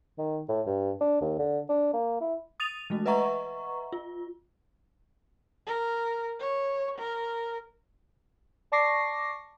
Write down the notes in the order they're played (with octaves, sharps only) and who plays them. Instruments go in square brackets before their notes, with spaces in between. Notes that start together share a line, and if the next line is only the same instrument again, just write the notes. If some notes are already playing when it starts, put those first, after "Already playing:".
[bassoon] D#3
A2
G2
D4
D#2
D3
D4
A#3
E4
[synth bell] D#6 A6 D#7 F7
E3 G#3 A3 F#4
B4 D#5 E5 F#5 A#5 C#6
F4
[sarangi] A#4
C#5
A#4
[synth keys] D5 A5 C#6 D6 A#6 C7